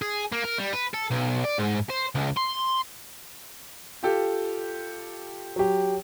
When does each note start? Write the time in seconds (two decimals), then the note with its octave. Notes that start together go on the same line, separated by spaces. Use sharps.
0.02 G#4
0.32 A#3
0.44 A#4
0.58 G3
0.73 B4
0.94 A4
1.11 B1
1.45 D5
1.59 G#2
1.90 C5
2.15 C#2
2.37 C6
4.03 F4 G4 A4
5.56 F#3 G4